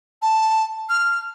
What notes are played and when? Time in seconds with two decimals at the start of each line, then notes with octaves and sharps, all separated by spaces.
0.22 A5
0.89 F6